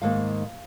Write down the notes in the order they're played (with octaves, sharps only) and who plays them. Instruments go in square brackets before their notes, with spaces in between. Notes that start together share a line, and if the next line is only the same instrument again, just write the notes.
[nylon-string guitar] G#2 D#3 A#3 F5